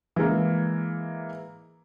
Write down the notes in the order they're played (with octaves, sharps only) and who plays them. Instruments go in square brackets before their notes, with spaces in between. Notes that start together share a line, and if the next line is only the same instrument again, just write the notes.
[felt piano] E3 G#3 A#3